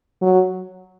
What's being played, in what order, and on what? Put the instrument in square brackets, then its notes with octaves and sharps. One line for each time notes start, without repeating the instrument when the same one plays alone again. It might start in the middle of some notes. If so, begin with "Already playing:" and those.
[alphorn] F#3